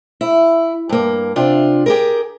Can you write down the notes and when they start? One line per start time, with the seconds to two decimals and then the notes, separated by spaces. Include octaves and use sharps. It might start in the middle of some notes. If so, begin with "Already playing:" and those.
0.21 E4
0.89 G2 A#3
1.36 C3 D4 F4
1.86 G4 G#4 A#4